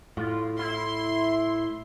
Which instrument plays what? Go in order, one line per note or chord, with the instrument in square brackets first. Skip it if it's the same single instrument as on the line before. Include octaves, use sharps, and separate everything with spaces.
[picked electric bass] A2 [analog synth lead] F4
[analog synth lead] E4 [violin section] C6